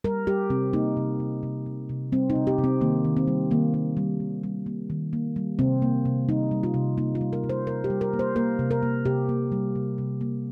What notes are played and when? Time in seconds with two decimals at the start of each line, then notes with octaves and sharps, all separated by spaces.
0.04 G3 A#4
0.27 G3 G4
0.50 C3 C4
0.73 A#3 D#4
0.97 C3
1.20 C3
1.43 C3
1.66 C3
1.89 C3
2.12 G3 C4
2.30 D#4
2.35 C3
2.47 G4
2.58 C3
2.64 C4
2.81 D#3 A#3
3.05 D#3
3.17 C4
3.28 G3
3.51 D#3 A#3
3.74 A#3
3.97 G3
4.20 D#3
4.44 G3
4.66 A#3
4.90 D#3
5.13 A#3
5.36 G3
5.59 C3 C4
5.82 A#3
6.05 C3
6.29 G3 D#4
6.51 G3
6.63 F4
6.74 C3
6.97 A#3 D#4
7.15 F4
7.21 G3
7.33 A#4
7.44 C3
7.49 C5
7.67 C3 A#4
7.84 G4
7.90 G3
8.01 A#4
8.13 A#3
8.19 C5
8.36 A#3 A#4
8.59 C3
8.71 A#4
8.83 A#3
9.05 C3 G4
9.29 A#3
9.52 G3
9.75 C3
9.98 C3
10.21 A#3